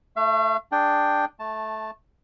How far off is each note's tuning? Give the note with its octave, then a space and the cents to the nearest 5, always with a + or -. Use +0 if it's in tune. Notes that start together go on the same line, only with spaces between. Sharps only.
A3 +0 E5 +45
D4 +5 G#4 +0 G5 +0
A3 -15 A5 +0